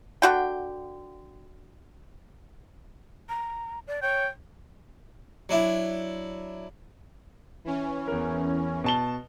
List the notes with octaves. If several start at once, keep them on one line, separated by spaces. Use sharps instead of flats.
D3 F#4 G5
A#5
D5
C#5 G5
F#3 D4 E4
E3 C#4
E2 A#4
B2 A5 G7